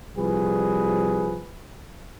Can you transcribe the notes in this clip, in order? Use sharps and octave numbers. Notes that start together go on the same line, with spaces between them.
C2 F3 G3 G#4 B4